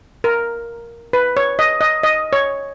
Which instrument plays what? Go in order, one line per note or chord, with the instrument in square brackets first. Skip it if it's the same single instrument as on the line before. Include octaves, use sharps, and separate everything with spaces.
[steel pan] A#4
B4
C#5
D#5
D#5
D#5
C#5